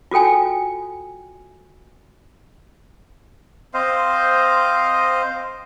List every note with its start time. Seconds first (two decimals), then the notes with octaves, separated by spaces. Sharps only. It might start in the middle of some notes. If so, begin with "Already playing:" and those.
0.11 F4 F#4 A4 G5 G#5
3.74 C4 C5 D#5 F5